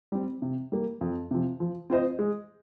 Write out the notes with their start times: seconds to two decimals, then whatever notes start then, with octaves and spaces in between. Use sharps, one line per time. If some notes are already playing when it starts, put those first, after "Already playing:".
0.12 G3 C4
0.42 C3
0.72 G3 A#3
1.01 F2
1.31 C3 F3
1.60 F3
1.90 C4 F4 C5 D#5
2.19 G#3